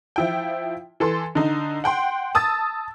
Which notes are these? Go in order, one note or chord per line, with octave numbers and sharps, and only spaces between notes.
F3 E4 G5
E3 A4 C6
D3 D#4
F#5 G5 C6
A5 D#6 E6 A6